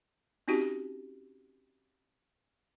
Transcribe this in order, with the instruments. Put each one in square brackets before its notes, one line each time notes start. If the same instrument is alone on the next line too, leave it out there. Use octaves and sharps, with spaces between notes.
[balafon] C4 C#4 D#4 F#4 G4